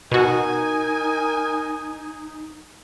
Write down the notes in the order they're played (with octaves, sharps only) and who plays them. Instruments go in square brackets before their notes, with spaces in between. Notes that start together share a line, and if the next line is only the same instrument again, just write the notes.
[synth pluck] B2 F#4 [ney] D#4 [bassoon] A#4 [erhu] G#5